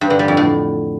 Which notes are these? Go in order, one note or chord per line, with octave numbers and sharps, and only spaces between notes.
G2
D3
G3
F2
A2